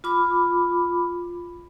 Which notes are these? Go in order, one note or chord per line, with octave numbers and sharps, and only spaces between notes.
F4 B5 D6